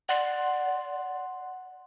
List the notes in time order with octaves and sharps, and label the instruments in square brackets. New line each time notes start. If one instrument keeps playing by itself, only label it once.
[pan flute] D5 [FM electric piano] F#5 C6